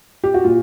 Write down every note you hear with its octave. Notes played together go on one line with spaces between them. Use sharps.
G4
F#4
A#2 F4